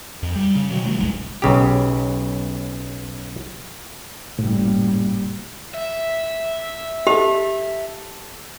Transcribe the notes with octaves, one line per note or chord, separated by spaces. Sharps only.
F2
G3
C#3
B2 D#3 F#3
C3 F#3 G3 A3
D#1 G#1 G#3
B1 C#3 G4
F#1 A2 G3
E5
G4 A4 F7